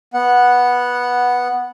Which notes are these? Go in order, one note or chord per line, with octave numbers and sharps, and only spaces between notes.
B3 F#5